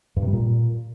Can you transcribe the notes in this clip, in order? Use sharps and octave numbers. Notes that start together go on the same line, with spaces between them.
G2
C3
G3
A#2